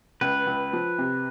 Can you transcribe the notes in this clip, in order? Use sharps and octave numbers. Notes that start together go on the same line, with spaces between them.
C#2 B4
C#2
F3
C3